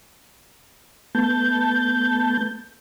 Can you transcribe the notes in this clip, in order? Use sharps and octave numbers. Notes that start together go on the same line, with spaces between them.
A3 B3 A5 G6